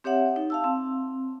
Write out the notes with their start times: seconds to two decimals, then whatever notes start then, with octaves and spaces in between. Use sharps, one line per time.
0.04 C4 G4 C#5 E5 F#5
0.36 D#4
0.50 F5 A5 E6
0.64 C4